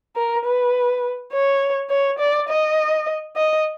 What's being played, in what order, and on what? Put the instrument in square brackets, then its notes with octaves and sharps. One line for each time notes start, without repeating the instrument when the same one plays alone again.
[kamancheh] A#4
B4
C#5
C#5
D5
D#5
D#5